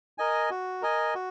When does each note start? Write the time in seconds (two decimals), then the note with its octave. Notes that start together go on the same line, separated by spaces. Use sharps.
0.18 A#4 D#5 G#5
0.50 F#4
0.82 A#4 D#5 G#5
1.15 F#4